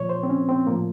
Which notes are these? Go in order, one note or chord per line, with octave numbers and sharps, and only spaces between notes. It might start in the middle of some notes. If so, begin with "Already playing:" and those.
Already playing: A#2 F3 C#5
C5
C4
C#4
C4
A2 F3 A#3